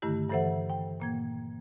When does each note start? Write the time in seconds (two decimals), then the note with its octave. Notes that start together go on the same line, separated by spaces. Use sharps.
0.02 G2 D3 D#3 A3 E4 G4
0.29 G2 E3 A4 C5 E5 F#5
0.70 G5
1.00 A#2 A#3 G#6